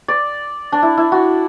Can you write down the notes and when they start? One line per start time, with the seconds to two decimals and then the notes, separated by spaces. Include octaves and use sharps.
0.08 D5
0.72 D4
0.83 E4
0.97 E4
1.12 F#4